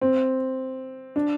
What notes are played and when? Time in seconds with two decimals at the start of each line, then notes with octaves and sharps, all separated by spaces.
0.01 C4
1.16 D4